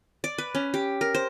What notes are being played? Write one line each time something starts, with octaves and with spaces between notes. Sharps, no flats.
D5
B4
C#4
G4
A#4
C5